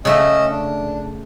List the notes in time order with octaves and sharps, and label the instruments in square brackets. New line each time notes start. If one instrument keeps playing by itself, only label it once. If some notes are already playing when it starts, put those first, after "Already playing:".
[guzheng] C#3 A3 E5 [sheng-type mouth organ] C#4 D#5 E6
[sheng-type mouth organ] D4